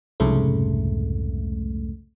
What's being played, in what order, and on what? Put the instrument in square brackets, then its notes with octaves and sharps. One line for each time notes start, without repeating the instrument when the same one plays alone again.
[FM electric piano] C2 F2 G#2 C#3 A3